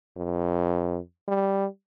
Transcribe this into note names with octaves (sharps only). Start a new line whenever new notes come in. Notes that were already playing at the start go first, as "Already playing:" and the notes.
F2
G3